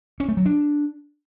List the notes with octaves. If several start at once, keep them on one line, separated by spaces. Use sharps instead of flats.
C#4
A3
F#3
D4